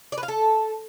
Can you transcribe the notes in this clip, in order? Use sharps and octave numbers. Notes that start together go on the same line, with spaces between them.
D5
B4
F5
A4